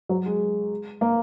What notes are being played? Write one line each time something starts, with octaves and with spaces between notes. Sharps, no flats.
F#3
G#3
A#3